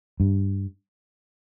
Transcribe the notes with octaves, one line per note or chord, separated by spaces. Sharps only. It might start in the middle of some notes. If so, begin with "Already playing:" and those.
G2